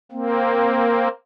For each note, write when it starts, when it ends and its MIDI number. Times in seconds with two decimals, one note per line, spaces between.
0.12 1.08 58
0.12 1.08 60